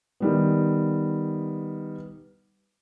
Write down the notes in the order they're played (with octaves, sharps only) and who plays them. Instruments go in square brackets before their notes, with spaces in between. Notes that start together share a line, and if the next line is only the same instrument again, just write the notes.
[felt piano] D#3 G3 B3